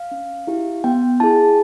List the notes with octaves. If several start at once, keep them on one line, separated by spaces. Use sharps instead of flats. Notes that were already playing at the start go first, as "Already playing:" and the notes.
Already playing: F5
C#4
E4 G4
B3 G5
E4 G#4 A5